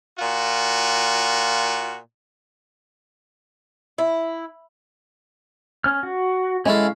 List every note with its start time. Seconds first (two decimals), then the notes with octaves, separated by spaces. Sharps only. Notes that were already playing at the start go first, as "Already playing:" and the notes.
0.19 A#2 F4 F#4
3.98 E4
5.84 C#4 F6
6.03 F#4
6.66 G#3 C#4 E4 A4 F5